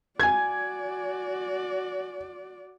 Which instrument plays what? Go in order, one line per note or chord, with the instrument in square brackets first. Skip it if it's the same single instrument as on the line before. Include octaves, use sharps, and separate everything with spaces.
[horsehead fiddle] F#4 D5 [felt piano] G#5 G#6